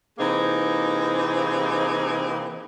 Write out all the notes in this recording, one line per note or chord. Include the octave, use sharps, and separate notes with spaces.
C3 E3 A#3 C4 D#4 G#4